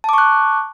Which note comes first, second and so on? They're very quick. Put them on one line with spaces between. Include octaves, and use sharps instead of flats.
A5 D6 C#6 F#6